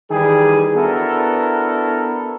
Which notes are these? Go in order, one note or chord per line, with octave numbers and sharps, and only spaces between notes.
D#3 E3 G3 G#4
B3 D4 E4 F#4 A4 A#4